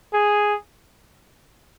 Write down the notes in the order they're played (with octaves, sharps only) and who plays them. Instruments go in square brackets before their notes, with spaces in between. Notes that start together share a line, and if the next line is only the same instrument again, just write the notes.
[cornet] G#4